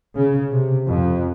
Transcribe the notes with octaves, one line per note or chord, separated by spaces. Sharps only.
C#3
C3
F2